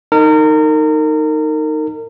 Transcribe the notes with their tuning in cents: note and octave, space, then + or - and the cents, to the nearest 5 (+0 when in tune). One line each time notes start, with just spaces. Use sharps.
D#4 +0 A#4 -30